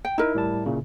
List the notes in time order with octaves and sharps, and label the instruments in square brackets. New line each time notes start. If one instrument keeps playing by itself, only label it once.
[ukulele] G5
[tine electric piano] D#4 [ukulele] E4 A#4
[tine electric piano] A2 G3 A5
A#2 C#3